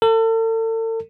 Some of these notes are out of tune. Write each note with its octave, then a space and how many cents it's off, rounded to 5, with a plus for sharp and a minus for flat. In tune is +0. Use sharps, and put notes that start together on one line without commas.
A4 +40